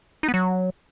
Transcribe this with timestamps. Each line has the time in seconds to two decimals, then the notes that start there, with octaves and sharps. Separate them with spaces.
0.23 D#4
0.28 B3
0.34 F#3